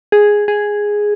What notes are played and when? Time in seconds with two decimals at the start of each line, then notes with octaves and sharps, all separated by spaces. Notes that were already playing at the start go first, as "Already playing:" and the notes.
0.12 G#4
0.48 G#4